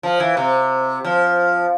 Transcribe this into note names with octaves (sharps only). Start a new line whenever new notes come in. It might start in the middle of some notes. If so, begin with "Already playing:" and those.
F3
E3
C3
F3